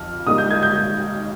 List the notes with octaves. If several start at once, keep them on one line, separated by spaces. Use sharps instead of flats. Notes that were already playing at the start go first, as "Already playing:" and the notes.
Already playing: F2 F6
G#2 G3 A#3 D#4 D#6
G6
G#6
G6